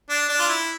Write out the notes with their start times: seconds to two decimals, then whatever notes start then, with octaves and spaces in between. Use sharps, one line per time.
0.10 D4
0.29 D4
0.39 F4
0.49 E4